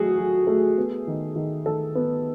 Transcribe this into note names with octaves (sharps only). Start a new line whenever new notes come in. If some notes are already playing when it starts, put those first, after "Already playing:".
Already playing: F#3 A3 F#4 G#4
F#3
A3
B3
D#3
D#3
D#3 A4
B3